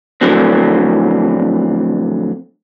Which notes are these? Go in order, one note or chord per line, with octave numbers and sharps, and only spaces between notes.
F2 A2 D3 F#3 C4